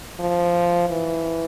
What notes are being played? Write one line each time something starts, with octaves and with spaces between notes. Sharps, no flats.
F3
E3